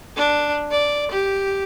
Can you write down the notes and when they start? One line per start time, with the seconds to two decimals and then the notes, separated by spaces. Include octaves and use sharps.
0.16 D4
0.71 D5
1.11 G4